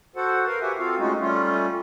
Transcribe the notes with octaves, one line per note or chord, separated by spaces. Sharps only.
F#4 A4 C5 F#5
A#4 B4 F5
F#4 G4 E5 F#5 G#5
C4 F4 F#4 A4 F5
G#3 A3 C#4 D#4 F4 F#4
G3 A3 C#4 F4